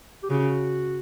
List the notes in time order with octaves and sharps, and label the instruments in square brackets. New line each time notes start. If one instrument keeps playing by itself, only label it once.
[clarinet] G4
[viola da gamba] C#3 [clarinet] F#4